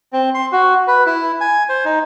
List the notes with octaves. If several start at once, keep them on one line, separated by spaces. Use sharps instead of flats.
C4
C6
F#4
B4
E4
G#5
C5
D#4